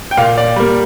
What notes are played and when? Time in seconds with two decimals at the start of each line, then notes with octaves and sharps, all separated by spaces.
0.11 G5
0.17 A#2 F4 F5
0.38 D5
0.56 G3 A#3